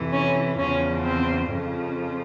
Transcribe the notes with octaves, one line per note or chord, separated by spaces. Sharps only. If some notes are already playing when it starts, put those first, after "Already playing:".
Already playing: F2 C3 E3
C#4
E2 C#3 F3 C#4
C4
F2 C#3 F3